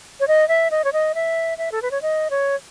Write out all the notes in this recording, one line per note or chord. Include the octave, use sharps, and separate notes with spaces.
C#5
D#5
E5
D#5
C#5
D#5
E5
E5
A4
B4
C#5
D#5
C#5